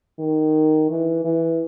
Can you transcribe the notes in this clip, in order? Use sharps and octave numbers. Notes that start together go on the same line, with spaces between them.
D#3
E3
E3